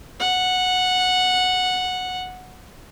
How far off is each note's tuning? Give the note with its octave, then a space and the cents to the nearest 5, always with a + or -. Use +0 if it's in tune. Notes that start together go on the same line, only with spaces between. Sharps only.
F#5 -10